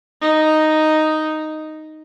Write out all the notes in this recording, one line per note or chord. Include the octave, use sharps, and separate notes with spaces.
D#4